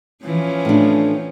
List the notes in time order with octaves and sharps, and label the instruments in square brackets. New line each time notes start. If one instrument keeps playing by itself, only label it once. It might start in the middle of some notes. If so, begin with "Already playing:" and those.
[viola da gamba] E3 F3 C#4
[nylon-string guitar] A2 D4